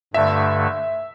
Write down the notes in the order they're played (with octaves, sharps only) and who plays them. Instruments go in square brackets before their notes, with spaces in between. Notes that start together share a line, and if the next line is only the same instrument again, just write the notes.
[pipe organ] G2 D3 A3 [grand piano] E5